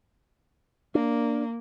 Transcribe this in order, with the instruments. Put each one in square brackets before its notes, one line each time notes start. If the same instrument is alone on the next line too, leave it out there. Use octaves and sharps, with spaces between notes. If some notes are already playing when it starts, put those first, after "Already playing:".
[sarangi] A#3 [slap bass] D4